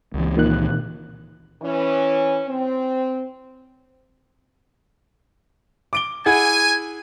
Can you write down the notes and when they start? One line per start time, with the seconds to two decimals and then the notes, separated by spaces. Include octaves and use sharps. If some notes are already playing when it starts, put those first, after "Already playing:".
0.14 C#2 E3
0.37 A#2 D#3 F#6
1.62 E3 C#4
2.49 C4
5.93 D6 D7 G7
6.26 E4 G#4 F#5 G#5